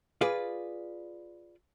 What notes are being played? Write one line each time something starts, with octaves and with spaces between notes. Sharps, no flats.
F4 G#4 B4 D5